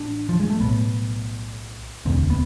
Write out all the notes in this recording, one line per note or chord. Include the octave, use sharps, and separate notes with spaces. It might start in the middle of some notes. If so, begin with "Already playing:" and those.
Already playing: A1 D4
F3
G#3
A3
B1 A2 B3
E1 D2 D3 C4
B3